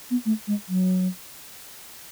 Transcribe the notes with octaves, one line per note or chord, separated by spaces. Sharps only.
B3
A3
G#3
F#3